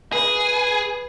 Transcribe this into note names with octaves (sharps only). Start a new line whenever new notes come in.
G#4 B4